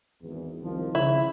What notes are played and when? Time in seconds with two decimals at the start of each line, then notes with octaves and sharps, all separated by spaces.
0.22 G#1 E2
0.61 C2 D#3 F3
0.95 C#3 E4